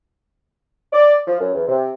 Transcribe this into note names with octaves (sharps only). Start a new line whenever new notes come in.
D5
F3
F#2
E2
C3